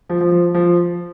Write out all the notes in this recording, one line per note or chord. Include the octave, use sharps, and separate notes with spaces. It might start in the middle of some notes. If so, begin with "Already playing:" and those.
F3
F3
F3
F3